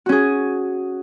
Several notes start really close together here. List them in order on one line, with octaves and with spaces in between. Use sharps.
F#4 C#4 G#4